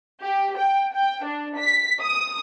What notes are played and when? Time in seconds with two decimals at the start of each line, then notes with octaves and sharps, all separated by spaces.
0.21 G4
0.58 G5
0.94 G5
1.25 D4
1.57 B6
2.01 D#6